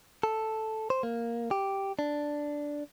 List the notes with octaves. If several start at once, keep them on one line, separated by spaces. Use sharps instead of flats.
A4
C5
A#3
G4
D4